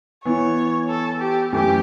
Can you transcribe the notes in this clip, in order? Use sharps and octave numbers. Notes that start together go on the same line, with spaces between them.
E3 B3 E4 C#5
A4
G4
F#2 E3 A3 G4